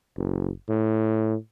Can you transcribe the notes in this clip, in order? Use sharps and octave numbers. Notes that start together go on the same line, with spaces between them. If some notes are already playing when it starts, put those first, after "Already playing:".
F#1
A2